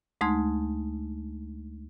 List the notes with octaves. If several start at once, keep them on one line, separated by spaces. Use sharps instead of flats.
D2 G#3 A3 D#4 C6 G#6